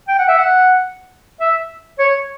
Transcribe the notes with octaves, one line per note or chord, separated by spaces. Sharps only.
G5
F#5
E5
F#5
E5
C#5